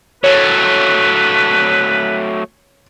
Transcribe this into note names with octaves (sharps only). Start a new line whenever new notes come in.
F#3 A3 B4 C#5